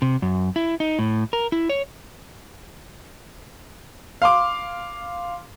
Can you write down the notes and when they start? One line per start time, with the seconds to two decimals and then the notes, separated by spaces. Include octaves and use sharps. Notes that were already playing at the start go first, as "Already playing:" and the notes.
0.02 C3
0.22 F#2
0.56 E4
0.80 D#4
0.99 A2
1.33 A#4
1.52 E4
1.70 C#5
4.22 F5 C6 D6